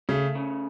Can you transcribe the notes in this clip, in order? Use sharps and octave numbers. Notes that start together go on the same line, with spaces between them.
C#3 A3
C#3